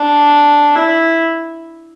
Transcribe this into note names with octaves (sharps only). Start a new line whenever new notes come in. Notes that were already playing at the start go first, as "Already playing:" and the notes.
Already playing: D4
E4